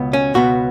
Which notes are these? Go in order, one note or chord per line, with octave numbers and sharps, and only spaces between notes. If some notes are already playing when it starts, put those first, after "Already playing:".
Already playing: C#2 B2 B3
C#4
C#2 B2 B3 F#4